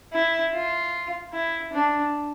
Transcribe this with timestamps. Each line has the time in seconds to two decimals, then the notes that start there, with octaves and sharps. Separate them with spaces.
0.13 E4
0.53 F4
1.33 E4
1.73 D4